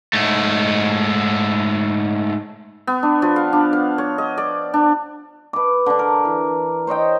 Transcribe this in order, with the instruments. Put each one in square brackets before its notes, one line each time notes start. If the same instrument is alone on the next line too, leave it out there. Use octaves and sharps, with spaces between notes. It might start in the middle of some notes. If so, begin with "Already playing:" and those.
[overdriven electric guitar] G#2 A3
[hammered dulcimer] B3
D4
F3
F5
D4
F5
C#5
D#5
D5
D4
B4 D6
D3 D4
A#4
E3
C5 C#5 D#5 G5